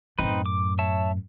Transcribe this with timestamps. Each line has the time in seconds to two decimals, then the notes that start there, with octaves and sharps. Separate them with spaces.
0.19 F#2 A2 C4 D#4 B4
0.46 D6
0.79 C#5 E5 A5